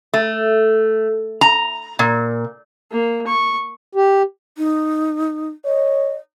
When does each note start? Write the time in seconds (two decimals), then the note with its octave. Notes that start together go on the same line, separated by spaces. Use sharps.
0.14 A3
1.41 A#5
1.99 A#2
2.91 A#3
3.27 C#6
3.95 G4
4.58 D#4
5.65 C#5 D#5